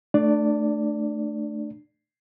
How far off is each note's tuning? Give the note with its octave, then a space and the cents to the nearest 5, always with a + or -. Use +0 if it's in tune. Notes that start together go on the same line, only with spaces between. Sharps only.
A3 +0 D4 +25 D5 -10